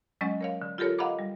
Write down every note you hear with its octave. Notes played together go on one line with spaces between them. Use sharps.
F#3 G#3 C#4 D#5
A#4 C#5 F5
D3
F4 G4 A4 A#4 C#5
D#5 F5 F#5 A#5 B5 D6
G3